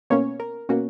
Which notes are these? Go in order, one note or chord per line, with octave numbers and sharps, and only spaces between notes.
B2 A#3 C#4 C#5
A#4
B2 A#3 C#4 F#4